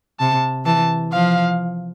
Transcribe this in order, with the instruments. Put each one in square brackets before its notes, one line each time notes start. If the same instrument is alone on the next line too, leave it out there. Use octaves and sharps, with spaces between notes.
[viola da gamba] C3 [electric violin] A5
[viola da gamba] E3 [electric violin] A5
[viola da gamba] F3 [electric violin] F5